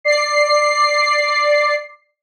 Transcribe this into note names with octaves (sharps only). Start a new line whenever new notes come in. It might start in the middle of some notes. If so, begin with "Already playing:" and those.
D5 C7